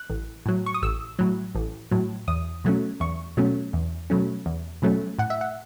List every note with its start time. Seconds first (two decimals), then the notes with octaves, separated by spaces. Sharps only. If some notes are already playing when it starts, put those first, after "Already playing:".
Already playing: F#6
0.10 A1
0.46 A2 F#3
0.66 C#6
0.74 D#6
0.82 A1 E6
1.19 A2 F#3
1.55 A1
1.91 A2 F#3
2.28 E2 D#6
2.64 B2 F#3 A3 C#4
3.00 E2 C#6
3.37 B2 F#3 A3 C#4
3.73 E2
4.10 B2 F#3 A3 C#4
4.46 E2
4.82 B2 F#3 A3 C#4
5.19 A2 F#5
5.30 E5
5.41 F#5